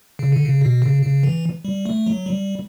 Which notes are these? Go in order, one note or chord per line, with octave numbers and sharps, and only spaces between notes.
C#3
D3
C#3
B2
C#3
C#3
E3
G3
A3
F#3
G3